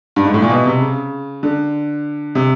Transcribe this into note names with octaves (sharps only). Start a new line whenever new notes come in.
G2
G#2
A2
A#2
B2
C3
C#3
D3
C3